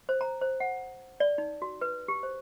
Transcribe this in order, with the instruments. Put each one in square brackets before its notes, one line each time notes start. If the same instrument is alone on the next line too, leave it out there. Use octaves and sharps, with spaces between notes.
[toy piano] C5
A#5
C5
F#5
D5
D#4
F#4
B4
G4
C5